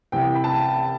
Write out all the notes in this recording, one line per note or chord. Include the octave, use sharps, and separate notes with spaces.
C2 C3 E3 G5
B5
A5